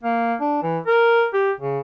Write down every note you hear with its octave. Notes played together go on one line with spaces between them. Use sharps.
A#3
D4
E3
A#4
G4
C#3